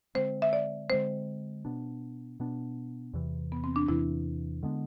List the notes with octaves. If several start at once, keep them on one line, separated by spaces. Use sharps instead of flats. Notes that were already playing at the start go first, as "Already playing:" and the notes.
D3 G#3 C4 C5
E5
D5
D3 G#3 C4 C5
B2 B3 D4
B2 B3 D4
E2 C3 E3
B3
C4
D4
E2 C3 E3 E4
D3 G#3 B3 D4